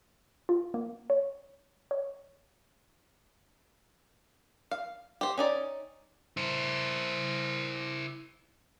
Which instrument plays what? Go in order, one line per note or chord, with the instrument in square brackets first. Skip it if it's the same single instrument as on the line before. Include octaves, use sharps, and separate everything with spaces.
[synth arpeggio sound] F4
A#3
C#5
C#5
[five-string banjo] F5
G4 C5
C#4 D#4 D5
[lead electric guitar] E4 C5